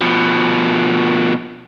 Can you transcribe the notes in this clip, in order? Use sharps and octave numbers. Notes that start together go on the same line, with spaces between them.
B2 F3